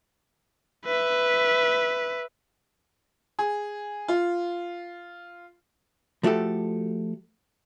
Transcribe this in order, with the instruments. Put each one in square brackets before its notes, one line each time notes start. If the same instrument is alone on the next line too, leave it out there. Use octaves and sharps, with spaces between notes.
[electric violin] B4 E5
[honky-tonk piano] G#4
F4
[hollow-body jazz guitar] F3 A3 F#4 G4 A4